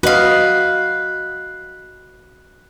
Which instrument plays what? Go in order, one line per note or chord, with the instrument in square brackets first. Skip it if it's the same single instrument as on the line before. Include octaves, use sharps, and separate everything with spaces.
[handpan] F#4 D#5 [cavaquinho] B4 F5